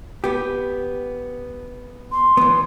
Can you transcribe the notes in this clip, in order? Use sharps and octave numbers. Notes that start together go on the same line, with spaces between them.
B3 G4
C6
E3 B3